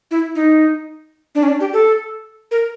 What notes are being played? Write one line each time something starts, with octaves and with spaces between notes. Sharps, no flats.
E4
D#4
D4
C#4
D4
G4
A4
A#4